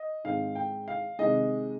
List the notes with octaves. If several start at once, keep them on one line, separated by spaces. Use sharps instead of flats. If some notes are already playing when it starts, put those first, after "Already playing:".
Already playing: D#5
G#2 D#3 G#3 C4 F5
G5
F5
C3 D#3 G#3 D#5